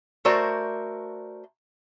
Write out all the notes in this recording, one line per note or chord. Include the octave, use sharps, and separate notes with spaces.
A3 F#4 A#4 C5 D5